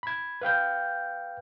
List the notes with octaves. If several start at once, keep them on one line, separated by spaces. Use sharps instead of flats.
B5 G#6
B4 F5 G5 G6